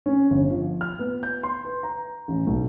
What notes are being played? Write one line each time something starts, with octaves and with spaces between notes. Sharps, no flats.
C#4
G1
F3
F6
B3
G6
C6
B4
A#5
A1
B1